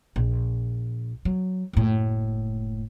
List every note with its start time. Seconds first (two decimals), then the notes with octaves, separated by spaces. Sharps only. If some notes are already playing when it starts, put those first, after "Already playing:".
0.16 A#1
1.25 F#3
1.73 F#1 A2